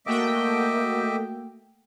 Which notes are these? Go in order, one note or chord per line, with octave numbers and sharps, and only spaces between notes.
A3 A#3 F#4 D#5 E5 G5 D6